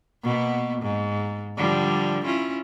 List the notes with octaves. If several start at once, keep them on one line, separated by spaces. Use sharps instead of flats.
B2 A#3 B3
G#2
D3 F3 G3
C#4 E4 F4